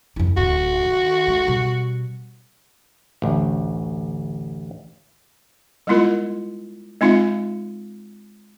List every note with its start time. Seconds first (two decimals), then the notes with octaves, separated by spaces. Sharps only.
0.16 F2 E4
0.37 D1 F#4
0.85 D#3
1.28 G#3
1.48 B2 G3
3.22 A1 D2
5.87 G3 G#3 B3 E4 F4 A#4
7.01 G#3 C4 D#4 F4 E5 F5